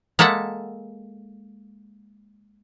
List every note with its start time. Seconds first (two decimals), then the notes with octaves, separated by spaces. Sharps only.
0.19 G#3 A#3 A4 E5 F#5